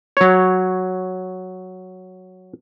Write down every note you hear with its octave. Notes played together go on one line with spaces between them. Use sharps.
F#3 C#5